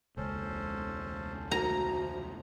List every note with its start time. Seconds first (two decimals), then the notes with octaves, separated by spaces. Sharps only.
0.17 E1 C#2 C#4 A4 C5
1.51 D2 F3 F#4 A#5